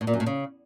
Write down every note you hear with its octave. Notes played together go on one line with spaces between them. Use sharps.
A2
A#2
F#2
A2
C#3